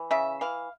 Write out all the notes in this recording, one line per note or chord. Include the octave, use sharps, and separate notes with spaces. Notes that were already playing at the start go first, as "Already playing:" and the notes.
Already playing: E3
C#3 E5
E3 F5